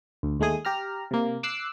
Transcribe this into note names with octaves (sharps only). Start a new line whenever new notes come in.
D2
D#2 G#3 A3 G#4 D#6
G4 A#5 F6
C3 A#3
D6 E6 F#6 C7